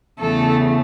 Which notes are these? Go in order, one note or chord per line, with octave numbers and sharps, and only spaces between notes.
E2 C#3 E3 A3 A4